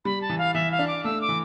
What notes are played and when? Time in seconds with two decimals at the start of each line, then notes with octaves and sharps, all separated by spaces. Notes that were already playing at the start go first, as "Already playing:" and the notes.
0.05 G3 B5
0.22 A5
0.30 E3
0.38 F5
0.54 E3 E5
0.71 F5
0.79 D4
0.87 D6
1.04 A3 E6
1.21 D6
1.29 E3